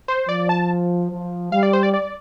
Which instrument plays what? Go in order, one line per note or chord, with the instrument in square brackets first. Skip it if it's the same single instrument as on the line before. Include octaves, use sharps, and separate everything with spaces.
[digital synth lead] C5
[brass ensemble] F3 [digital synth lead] D5
[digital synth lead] A5
[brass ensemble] F3
[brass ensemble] G3 [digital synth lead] F5
[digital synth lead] D5
C5
D5
D5